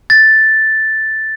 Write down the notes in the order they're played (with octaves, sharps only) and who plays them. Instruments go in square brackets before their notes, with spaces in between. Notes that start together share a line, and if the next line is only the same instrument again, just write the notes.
[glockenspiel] A6